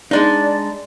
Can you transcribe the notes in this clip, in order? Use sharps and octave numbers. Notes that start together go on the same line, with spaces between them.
G#3 D4 D#4 D5